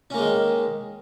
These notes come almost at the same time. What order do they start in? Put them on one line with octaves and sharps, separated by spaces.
C#4 A#3 G#3 D#3